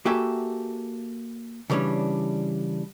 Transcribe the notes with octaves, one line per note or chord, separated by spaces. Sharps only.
A#3 F#4 G4 A4 E5 G#5
C#3 E3 G3 C#4 D4